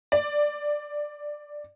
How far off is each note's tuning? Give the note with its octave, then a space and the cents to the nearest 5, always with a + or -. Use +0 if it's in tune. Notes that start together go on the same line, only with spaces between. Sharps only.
D5 +5